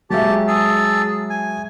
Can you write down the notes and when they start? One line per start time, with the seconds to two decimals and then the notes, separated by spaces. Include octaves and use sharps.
0.10 F#3 G#3 G4 E5 A5
0.48 G#4 A5 E6
1.30 G#5